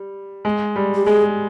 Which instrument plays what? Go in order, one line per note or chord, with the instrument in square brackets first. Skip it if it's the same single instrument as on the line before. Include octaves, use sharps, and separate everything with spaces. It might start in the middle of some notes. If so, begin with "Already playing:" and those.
Already playing: [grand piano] G3
G#3
G3
[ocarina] G4
[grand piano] G#3 [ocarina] G#4